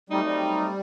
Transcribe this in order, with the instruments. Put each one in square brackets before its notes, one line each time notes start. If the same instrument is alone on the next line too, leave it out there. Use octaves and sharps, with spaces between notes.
[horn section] F#3 A3 C4 D#4 [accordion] G3
[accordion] G3